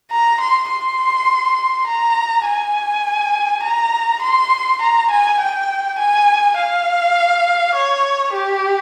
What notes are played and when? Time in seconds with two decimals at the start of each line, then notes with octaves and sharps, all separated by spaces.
0.11 A#5
0.40 C6
0.70 C6
1.87 A#5
2.45 G#5
3.63 A#5
4.22 C6
4.81 A#5
5.10 G#5
5.40 G5
5.98 G#5
6.57 F5
7.75 C#5
8.33 G4